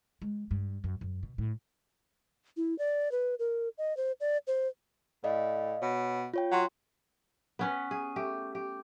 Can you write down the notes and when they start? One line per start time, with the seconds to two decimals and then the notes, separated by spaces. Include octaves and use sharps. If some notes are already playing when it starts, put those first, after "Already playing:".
0.22 G#3
0.51 G2
0.84 F#2
1.01 F#2
1.23 B2
1.38 A2
2.57 E4
2.79 D5
3.12 B4
3.39 A#4
3.78 D#5
3.97 C5
4.20 D5
4.47 C5
5.24 A2 D5 D#5 F5
5.82 B2 C#5
6.34 F4 C#5 G5
6.52 F#3 F#5 C6
7.59 B3 C#4 B4
7.91 G#4
8.16 A3 G4
8.55 G4